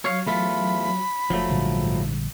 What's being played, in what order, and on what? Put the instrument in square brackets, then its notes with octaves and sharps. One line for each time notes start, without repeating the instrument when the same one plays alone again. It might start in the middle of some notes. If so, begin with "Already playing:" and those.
[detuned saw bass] F#3 [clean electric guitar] C#5 F5
[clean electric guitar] E2 A3 F4 [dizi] B5
[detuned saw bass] F#1 [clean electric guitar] F3 F#3 A3
[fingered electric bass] A#1 D3 G3 [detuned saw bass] G#2